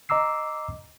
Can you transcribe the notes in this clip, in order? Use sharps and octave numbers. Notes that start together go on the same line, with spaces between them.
D#5 A#5 D6 E6 C7